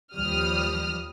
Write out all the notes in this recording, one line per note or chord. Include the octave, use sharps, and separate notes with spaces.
D#2 F3 G3 D#6 F6